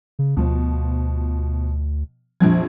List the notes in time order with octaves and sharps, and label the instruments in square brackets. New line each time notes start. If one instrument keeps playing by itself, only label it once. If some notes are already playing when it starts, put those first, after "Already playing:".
[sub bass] C#3
[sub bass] D2 [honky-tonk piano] B2 F3
[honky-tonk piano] A#1 F2 G#6 [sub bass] F3